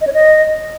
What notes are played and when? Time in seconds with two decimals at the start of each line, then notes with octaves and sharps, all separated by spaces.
0.01 D#5
0.07 C#5
0.13 D#5